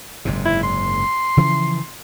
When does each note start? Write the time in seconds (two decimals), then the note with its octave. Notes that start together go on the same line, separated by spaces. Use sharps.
0.25 F#1 G#2 C3
0.45 E4
0.63 C6
1.37 C#3 E3 F3